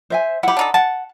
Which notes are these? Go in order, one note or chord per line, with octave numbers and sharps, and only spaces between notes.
C5 E5 G#5
E4 G4 F#5 B5
D4 D#4 A4
F#5 A5